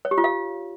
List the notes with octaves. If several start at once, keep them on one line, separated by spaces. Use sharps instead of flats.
C#5
G4
F4
F5